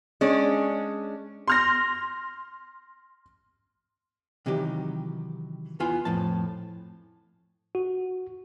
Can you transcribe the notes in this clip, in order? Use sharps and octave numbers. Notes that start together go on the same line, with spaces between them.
G#3 C#4 D4
C6 F6 A#6
C3 D#3 E3 F#3 D#4 G4
E2 B3 E4 F4 G#5 C6
F2 A2 F3 A5
F#4